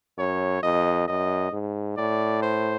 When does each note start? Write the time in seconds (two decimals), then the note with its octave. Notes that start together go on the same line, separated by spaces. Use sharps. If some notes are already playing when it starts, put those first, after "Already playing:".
0.18 F#2 C#5
0.63 F2 D#5
1.08 F#2 D#5
1.52 G#2
1.97 A2 D5
2.42 C5